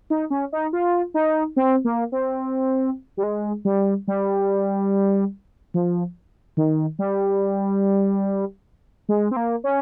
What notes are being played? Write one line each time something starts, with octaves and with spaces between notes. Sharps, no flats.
D#4
C#4
D#4
F4
D#4
C4
A#3
C4
G3
G#3
G3
G3
F3
D#3
G3
G#3
C4
A#3
C#4